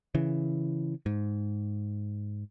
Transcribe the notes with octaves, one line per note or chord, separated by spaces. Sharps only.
C#3 E3
G#2